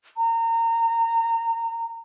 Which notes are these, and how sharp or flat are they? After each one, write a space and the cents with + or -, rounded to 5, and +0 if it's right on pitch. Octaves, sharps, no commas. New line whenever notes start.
A#5 -25